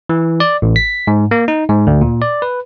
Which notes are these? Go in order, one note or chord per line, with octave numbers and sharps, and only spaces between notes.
E3
D5
A1
B6
G#2
A#3
D#4
G#2
D2
A#2
D5
B4